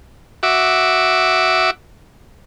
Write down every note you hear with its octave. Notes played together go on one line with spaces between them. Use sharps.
F#4 E5 D6